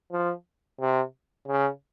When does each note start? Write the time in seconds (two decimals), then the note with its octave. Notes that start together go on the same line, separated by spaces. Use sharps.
0.12 F3
0.81 C3
1.48 C#3